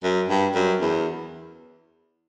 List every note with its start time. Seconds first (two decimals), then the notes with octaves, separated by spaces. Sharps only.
0.03 F#2
0.29 G2
0.55 F#2
0.81 E2